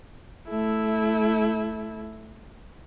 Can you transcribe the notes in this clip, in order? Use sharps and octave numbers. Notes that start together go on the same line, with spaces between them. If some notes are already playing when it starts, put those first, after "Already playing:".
A3 E4